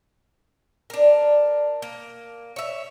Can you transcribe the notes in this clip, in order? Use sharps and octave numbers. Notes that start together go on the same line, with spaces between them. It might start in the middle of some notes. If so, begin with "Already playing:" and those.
D4 A#4
A#3
C#5 E5